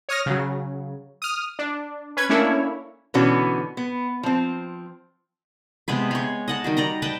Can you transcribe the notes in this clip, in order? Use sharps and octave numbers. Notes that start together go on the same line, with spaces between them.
C#5 D#6 F6 A#6
C#3 F#3
D#6 F6
D4
C#4 B4 G#6
A3 A#3 C#4 D4 E4 C#5
B2 D3 E3 B3 C#4 F#4
B3
F3 C4
C3 G#3 B3 B4
G#3 C#5
D#5 F#5 A5
D#3 G3 F#4
D5 D#5 A#5
B4 D#5 G5 A5